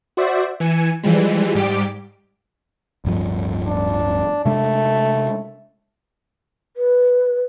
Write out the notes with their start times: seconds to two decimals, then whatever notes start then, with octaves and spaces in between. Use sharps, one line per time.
0.17 F#4 C5 D5 E5
0.60 E3 G#5 C#7 E7
1.03 E3 F3 G3 G#3
1.55 G#2 G3 G4 D6 D7
3.05 D1 G2 F3
3.67 D4
4.46 C3 G#3 A3 D4
6.77 B4